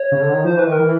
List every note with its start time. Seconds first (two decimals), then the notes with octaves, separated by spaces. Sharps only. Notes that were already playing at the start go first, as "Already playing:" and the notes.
Already playing: C#5
0.12 C#3
0.22 D3
0.33 D#3
0.44 F3 C5
0.57 E3 B4
0.67 D#3
0.72 A#4
0.79 E3